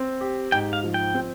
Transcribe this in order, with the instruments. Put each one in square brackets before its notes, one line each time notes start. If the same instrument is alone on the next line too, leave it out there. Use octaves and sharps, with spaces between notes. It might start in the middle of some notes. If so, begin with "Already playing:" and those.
Already playing: [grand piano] C4
G4
[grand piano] G#2 [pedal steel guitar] G5
[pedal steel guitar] F5
[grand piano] F3
[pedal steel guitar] G5
[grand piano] C4